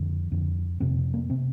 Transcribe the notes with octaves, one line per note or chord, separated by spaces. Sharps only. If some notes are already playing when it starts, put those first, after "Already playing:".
Already playing: F2 D3
F2 D3
F2 C3 C4
A#3
C3 C4